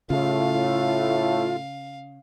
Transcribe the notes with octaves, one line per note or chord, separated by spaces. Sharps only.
A2 C#3 A3 F4 F5